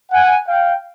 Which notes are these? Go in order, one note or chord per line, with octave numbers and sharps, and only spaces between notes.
F#5 G#5
F5 G5